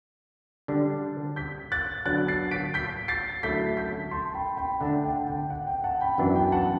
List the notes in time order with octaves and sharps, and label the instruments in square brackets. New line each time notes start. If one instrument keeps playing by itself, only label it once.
[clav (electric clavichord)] D3 G3 D4
[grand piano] G6 B6
F#6 A6
[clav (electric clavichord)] D3 F#3 B3 D4 [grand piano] F#6 A6
[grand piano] A6 C7
B6 D7
G6 B6
A6 C7
[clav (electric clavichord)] D3 F#3 A3 E4 [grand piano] G6 B6
[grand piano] G6 B6
A5 C6
G5 B5
G5 B5
[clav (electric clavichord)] D3 A3 D4 [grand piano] F#5 A5
[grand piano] G5
G5
F#5
G5
F#5 A5
G5 B5
[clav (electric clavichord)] F#2 E3 B3 D4
[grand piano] G5
F#5 A5